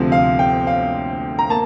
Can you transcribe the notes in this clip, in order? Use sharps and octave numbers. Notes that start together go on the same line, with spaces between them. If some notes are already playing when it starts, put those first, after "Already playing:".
Already playing: D2 C3 F3
F5
G5
F5
A#5
A#3 A5